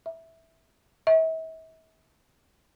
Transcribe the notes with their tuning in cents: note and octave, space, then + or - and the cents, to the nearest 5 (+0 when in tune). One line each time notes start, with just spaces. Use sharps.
E5 -10
E5 -40